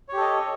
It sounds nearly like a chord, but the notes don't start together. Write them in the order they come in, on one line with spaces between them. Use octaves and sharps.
C#5 G4 A4 D#5